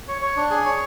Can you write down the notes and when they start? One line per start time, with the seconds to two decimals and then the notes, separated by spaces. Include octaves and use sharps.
0.08 C#5
0.22 C#5
0.37 D4
0.50 G#4
0.66 C#5